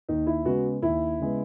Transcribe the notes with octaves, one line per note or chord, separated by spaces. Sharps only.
D#2 D#4
E4
C#3 G#3 B3 F#4
D#2 E4
C#3 G#3 B3